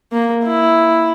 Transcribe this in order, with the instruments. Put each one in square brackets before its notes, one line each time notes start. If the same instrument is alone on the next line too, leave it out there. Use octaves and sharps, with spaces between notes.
[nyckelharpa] A#3
E4